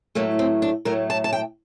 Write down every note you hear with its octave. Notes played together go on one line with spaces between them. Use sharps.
A2 F#3 A3 A#3
C4
D4
A2 F#3 A3 A#4
A5
A5
G5